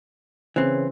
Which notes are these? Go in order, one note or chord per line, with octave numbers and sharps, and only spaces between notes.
C#3 E3 C4